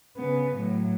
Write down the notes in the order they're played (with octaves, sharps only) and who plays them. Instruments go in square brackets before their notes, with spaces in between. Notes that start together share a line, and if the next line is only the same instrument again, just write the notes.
[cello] C#3 B3
A2 F#3